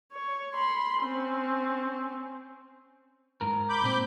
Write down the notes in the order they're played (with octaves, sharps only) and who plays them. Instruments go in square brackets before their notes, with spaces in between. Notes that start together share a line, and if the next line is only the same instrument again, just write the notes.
[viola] C#5
B5 C6
C4 C#4
[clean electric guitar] G#2 A#4
[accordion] B5 D6 G6
[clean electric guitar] A#2 C4